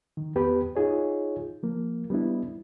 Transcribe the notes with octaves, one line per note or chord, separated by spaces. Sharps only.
D#3
E2 B3 G4 B4
D#4 F4 G#4 C#5
F3 A#3
G3 B3 D4 E4